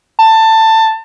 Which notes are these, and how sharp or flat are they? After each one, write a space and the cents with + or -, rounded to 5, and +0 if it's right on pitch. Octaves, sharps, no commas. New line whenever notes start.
A5 +15